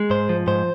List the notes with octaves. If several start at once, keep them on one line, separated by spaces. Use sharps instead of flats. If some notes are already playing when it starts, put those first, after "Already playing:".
Already playing: G#3
G#2 C5
F3
G#2 C5